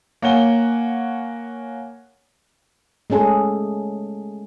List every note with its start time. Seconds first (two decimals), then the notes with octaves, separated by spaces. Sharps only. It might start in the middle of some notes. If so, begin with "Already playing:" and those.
0.22 A#3 C#5 F#5 G#5 G7
3.10 G#3 A3 C#4 G#4 A4